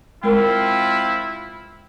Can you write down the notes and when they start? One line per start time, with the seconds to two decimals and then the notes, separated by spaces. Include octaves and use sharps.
0.24 G#3 C4 E4 F4 A#4